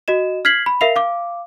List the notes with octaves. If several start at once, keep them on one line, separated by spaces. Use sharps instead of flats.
F#4 D#5 E7
F6 G#6 B6 C7 F#7
B5
A#4 E5 F5 C7 F7
F5 D6